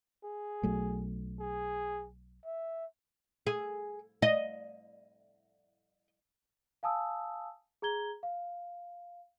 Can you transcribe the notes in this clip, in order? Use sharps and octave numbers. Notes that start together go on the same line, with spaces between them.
G#4
B1 F#3 A3
G#4
E5
G#4
D#5
F5 G#5 A5 D#6 E6
G#4 A#5 G#6 G7
F5